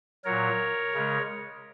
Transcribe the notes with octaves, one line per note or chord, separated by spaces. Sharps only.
A#2 F#3 A#4 C#5
C#3 G#3